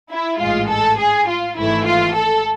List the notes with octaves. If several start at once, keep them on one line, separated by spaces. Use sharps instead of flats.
E4
A1 G#2 G#3 F4
A4
G#4
F4
G#1 G#2 E3 A3 E4
F4
A4